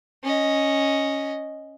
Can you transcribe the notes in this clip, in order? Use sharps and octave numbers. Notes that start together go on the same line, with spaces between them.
C#4 D#5